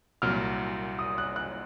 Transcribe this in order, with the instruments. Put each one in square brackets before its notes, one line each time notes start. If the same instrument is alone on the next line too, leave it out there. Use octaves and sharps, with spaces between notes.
[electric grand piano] C2 A#2 F#3 [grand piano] F6
[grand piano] D#6
F#6
F#6